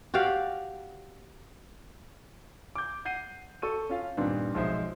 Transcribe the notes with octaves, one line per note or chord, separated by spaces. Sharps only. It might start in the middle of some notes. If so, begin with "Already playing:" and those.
F#4 G4 D5 F5
D6 G6
F#5 G6 C7 D#7
A4 C#6 D#7
C#4 F4 F5
G2 A#2 D#3 B3 C4 D4
B1 F3 G#3 D#4 C5 E5